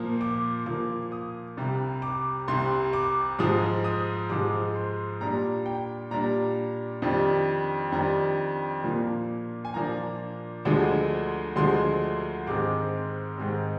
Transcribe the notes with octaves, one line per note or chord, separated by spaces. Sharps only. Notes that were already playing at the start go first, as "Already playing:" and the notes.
Already playing: A#2 F3 A#3
D6
A#2 F3 A#3 D6
D#6
C2 C3 G3
D6
C2 C3 G3 C6
D6
G#2 F3 G#3 D#6
D#6
G#2 F3 G#3 D6
C6
A#2 G3 D4 A#5
G5
A#2 G3 D4 A#5
F2 D#3 G3 D4
F2 D#3 G3 D4 A#5
A#2 F3 A#3 D4
G#5
A#2 F3 A#3 D4 A#5
D2 D3 F3 G#3
D2 D3 F3 G#3 C6
G#2 D#3 G#3 C4 D6
G#2 D#3 G#3 C4